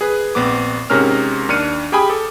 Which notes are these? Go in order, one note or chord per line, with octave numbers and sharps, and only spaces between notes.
G#4 B4
A#1 B3 C4 D6
G#2 C3 G#3 C#4 A#4 F6
D#2 D4 F6 C#7 D#7
G4 G#4 G5 G#5 B5 D#6
A4 D6